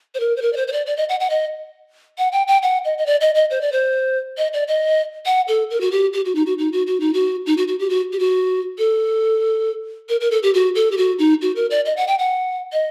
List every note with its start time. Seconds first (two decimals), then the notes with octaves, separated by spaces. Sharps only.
0.15 C5
0.20 A#4
0.37 C5
0.42 A#4
0.53 D5
0.57 C5
0.68 C5
0.72 D5
0.86 D5
0.97 D#5
1.09 F#5
1.20 F#5
1.30 D#5
2.18 F#5
2.32 G5
2.48 G5
2.63 F#5
2.85 D#5
2.98 D#5
3.06 D5
3.21 D#5
3.35 D#5
3.51 C5
3.61 D5
3.72 C5
4.38 D#5
4.53 D5
4.68 D#5
5.26 F#5
5.48 A4
5.71 A#4
5.81 F#4
5.91 G4
6.13 G4
6.25 F#4
6.35 D#4
6.46 F#4
6.58 D#4
6.73 F#4
6.87 F#4
7.00 D#4
7.14 F#4
7.46 D#4
7.57 F#4
7.68 F#4
7.79 G4
7.90 F#4
8.13 G4
8.19 F#4
8.78 A4
10.09 A#4
10.21 A#4
10.31 A4
10.43 G4
10.54 F#4
10.75 A4
10.92 G4
10.97 F#4
11.19 D#4
11.42 F#4
11.56 A#4
11.70 D5
11.86 D#5
11.97 F#5
12.08 G5
12.19 F#5
12.73 D#5